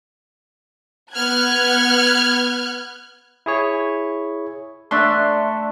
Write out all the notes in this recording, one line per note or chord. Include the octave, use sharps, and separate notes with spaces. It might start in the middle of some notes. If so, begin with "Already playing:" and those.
B3 F6 F#6 G#6
E4 G#4 C#5
A3 D4 D5 E5 C6